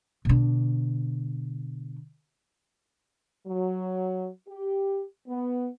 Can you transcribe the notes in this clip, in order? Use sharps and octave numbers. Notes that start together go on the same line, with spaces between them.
B2 D3
F#3
G4
B3